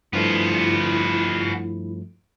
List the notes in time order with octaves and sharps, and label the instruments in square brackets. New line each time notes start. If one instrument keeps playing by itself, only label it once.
[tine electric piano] G2 F3 A3 [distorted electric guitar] B3 F4 [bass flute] E4